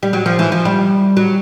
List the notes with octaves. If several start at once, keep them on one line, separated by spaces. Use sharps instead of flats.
G3
F#3
F3
E3
F3
G3
F#3